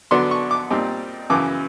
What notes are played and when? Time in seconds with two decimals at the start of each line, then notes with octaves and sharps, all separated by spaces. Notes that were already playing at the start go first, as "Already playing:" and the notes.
0.11 D3 F#3 B3 D4 C6
0.31 C#6
0.51 D6
0.71 A#2 G3 C4 D#4
1.30 F#2 C#3 E3 D6